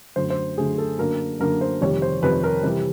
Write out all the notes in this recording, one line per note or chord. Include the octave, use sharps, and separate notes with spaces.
F#2 D3 F#3 A3 C5
C5
F#2 D3 F#3 A3 G#4
A4
F#2 D3 F#3 A#3 D4 A#4
F#2 D3 F#3 A#3 D4 A#4
C5
F2 C3 D#3 G3 C#5
C5
F2 C3 D#3 G3 B4
A#4
C3 E3 G3